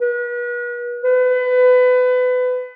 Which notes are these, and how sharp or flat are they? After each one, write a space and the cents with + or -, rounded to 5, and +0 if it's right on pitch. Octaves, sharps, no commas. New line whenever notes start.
B4 -40
B4 +25